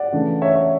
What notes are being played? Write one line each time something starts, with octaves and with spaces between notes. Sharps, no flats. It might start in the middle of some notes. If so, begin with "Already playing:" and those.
Already playing: D5 F#5
C#3 E3 A3 D4
C#5 E5
C#5 E5